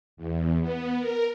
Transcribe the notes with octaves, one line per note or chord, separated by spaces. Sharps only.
E2
B3
A#4